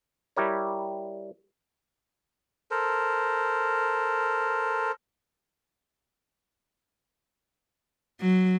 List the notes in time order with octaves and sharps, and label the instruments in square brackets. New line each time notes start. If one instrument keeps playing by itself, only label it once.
[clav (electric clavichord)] G3 E4 G4 A#4 C#5
[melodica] A4 A#4 C5
[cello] F#3